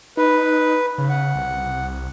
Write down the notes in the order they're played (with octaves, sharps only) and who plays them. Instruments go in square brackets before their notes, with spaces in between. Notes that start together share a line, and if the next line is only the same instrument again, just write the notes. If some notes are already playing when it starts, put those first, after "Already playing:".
[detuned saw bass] D#4 [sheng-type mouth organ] B4
[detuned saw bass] C#3
[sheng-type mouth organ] F#5
[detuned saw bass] C2